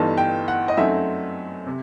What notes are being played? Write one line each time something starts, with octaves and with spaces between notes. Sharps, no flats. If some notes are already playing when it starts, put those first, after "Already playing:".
Already playing: G1 G2 E3 A3 D#4 A5
G5
F#5
D#5
F#2 F#3 A3 C4 D#4 E5
C3